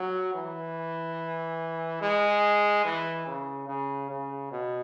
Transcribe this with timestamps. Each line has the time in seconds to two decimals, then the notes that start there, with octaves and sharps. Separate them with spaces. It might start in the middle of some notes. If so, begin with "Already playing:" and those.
Already playing: F#3
0.34 E3
2.02 G#3
2.85 E3
3.27 C#3
3.68 C#3
4.10 C#3
4.51 B2